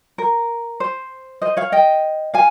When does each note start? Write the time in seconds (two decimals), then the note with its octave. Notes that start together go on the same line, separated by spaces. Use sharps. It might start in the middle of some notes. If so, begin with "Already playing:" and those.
0.18 A#4
0.80 C5
1.42 C5 D#5
1.57 C#5 F5
1.72 D#5 G5
2.34 F5 G#5